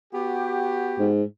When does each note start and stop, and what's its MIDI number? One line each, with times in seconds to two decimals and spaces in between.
0.14 1.10 59
0.14 1.10 66
0.14 1.10 67
0.99 1.23 44